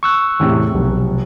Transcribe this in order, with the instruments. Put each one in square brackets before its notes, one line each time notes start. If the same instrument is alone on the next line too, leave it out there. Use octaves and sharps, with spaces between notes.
[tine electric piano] C#6 E6 F#6
[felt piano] E2 A2 C3
[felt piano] F1 [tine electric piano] B1